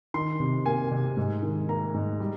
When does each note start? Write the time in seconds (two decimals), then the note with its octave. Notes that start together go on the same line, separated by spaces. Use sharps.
0.14 D#3 C6
0.40 C3
0.66 A#3 G#5
0.91 C3
1.17 G#2
1.42 D#3
1.68 A#3 A#5
1.94 G#2
2.20 G3